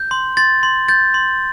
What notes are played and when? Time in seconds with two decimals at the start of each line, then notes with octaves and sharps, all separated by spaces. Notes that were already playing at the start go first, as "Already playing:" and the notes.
Already playing: G6
0.11 C6
0.37 C6 A6
0.63 C6
0.88 G6 A6
1.14 C6